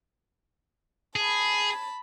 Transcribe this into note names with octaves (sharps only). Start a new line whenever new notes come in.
G#4 A5 B5